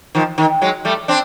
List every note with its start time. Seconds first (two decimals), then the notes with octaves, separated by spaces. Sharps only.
0.15 D#3 F3
0.38 D#3
0.62 F#3 G#3
0.85 G3 A3
1.08 C4 D4